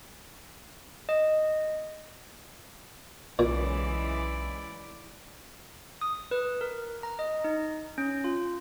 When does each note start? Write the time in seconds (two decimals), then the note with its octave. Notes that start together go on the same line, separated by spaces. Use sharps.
1.09 D#5
3.39 B1 A#2 C#3 E3 G#3 E4 D5
6.01 D#6
6.31 B4
6.61 A#4
7.03 A#5
7.19 D#5
7.44 D#4
7.98 C#4
8.24 F4